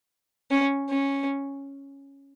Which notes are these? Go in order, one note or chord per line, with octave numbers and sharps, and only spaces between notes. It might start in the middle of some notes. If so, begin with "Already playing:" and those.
C#4
C#4